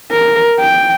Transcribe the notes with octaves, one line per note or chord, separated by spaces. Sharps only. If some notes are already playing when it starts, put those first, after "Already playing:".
A#4
G5